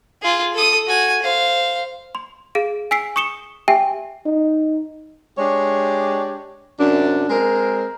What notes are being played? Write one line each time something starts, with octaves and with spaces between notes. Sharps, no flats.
F4 G#4
A4 D#6
F#4 G#5
C5 F5
C6
G#4 F5 D7
G#5 E6 B6 C7 D7
C#6 D#6 C#7 E7 G7
G4 E5 G5 G#5
D#4
G#3 D4 G4 C#5
F#2 C3 D4
G#3 C4 A#4